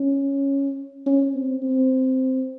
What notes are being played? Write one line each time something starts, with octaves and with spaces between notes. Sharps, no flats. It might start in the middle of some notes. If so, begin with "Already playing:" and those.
Already playing: C#4
C#4
C4
C4